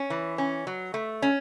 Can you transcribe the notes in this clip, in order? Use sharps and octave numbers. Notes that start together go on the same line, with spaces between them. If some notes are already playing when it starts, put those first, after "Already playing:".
Already playing: C#4
E3
C#4
F#3
A3
C#4